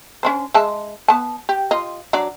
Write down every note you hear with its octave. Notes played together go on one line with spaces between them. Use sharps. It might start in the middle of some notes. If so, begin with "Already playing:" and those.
C#4 D4 C5
G#3 E5 A5
B3 A5
G4
F4 D#5
F#3 D4 D5